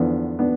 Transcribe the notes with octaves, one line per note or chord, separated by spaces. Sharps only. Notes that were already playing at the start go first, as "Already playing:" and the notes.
Already playing: E2 D3 F3 B3 D4
B3 D4